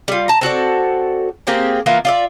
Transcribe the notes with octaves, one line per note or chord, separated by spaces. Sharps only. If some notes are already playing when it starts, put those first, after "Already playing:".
G3 F4
A5 A#5
C4 F#4 A4 D5
A#3 C4 G4 G#4
E3 A#3 B3 F4
F4 D5 E5